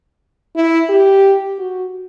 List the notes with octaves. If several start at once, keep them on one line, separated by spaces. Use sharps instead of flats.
E4
G4
F#4